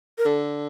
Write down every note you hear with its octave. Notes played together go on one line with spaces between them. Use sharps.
A#4
D3 A4